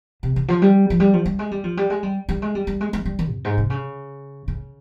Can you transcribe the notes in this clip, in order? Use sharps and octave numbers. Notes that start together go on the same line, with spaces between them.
C3
C#3
F3
G3
F3
G3
F3
G3
G#3
G3
F3
G3
G#3
G3
G3
G#3
G3
G3
G#3
G#3
G3
D#3
F2
G#2
C3
C#3
C#3